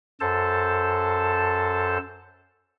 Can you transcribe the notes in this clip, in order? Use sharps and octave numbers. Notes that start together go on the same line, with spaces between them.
F#2 A4 C5 A5